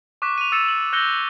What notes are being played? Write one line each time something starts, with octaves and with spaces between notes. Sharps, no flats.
C#6 D6 F#6 B6
D#7 F7
E6 A6 C#7 E7
F#7
E6 F#6 G6 A#6 C#7 G7